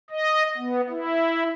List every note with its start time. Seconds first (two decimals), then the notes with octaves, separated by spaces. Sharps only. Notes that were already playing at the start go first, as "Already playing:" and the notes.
0.10 D#5
0.57 B3
0.90 E4